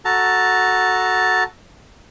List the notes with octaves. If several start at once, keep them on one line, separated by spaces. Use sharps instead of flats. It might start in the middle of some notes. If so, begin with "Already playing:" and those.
F#4 A4 A5 A#5